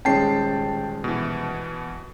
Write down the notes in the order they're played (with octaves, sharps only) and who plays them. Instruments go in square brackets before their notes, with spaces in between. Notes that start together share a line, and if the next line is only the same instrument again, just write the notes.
[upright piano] D#1 G#3 C#4 [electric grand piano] G5 A5 C7
[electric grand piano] B2 E3